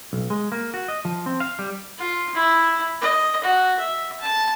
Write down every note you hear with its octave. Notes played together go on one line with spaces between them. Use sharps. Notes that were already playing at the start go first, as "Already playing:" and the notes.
B1
G#3
A#3
F#4
D#5
F3
C4
F5
G3
F4
E4
D#5
F#4
E5
A5